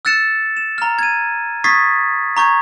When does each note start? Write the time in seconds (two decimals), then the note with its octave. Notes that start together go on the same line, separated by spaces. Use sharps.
0.05 E6 F#6 A6 C#7 E7
0.57 E7
0.78 A#5 F6
0.99 G#6 D#7
1.64 C#6 D#6 G#6 A6 B6 C7
2.37 A#5 C#6 G6 G#6